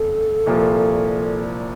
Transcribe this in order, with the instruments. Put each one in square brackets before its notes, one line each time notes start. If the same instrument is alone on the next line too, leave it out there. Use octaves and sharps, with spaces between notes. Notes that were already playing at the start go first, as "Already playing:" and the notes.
Already playing: [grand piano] F#1 F2 C#3 [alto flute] A4
[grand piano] C2 A#2 F3 A#3